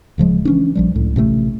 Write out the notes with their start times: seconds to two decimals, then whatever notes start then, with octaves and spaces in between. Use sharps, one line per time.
0.18 D1 C#3 F3 G#3
0.45 E3 C#4 D4
0.75 A#1 F3 G3
0.95 C#2 A2
1.16 A1 C3 D#3 A3